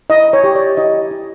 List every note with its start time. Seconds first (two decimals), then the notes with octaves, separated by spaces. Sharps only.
0.10 E4 D#5
0.33 C#5
0.44 G4
0.55 D5
0.77 E4 D#5
1.11 E4